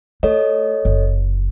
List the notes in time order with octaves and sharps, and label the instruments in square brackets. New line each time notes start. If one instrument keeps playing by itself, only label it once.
[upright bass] A3 [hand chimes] A4 C#5 D#5
[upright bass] F#1